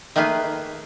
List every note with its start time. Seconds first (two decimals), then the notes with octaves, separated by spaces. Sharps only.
0.16 D#3 A3 A#3 G#4 B4